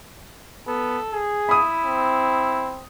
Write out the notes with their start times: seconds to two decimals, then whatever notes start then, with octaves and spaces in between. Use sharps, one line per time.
0.67 B3 A4
1.13 G#4
1.49 E4 B5 D#6
1.85 C4